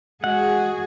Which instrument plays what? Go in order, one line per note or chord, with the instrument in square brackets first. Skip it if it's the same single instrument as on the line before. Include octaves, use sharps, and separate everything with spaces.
[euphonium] G#3 [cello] F#4 G#4 [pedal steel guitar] F#5